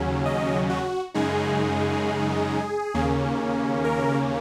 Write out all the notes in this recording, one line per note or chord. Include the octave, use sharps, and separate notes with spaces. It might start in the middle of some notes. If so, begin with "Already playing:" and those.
Already playing: D#2 C#3 F#3 C#4
D#5
F#4
F#2 C#3 G#3 D#4 G#4
D#2 C#3 A#3 C#4
A#4